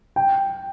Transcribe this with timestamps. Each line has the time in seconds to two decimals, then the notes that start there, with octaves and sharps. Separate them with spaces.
0.16 G5